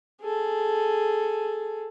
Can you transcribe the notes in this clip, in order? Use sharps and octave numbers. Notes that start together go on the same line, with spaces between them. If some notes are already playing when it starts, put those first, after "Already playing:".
G#4 A4